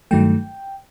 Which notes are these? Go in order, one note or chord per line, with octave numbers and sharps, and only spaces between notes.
G2 D#3 F#3 A3 G5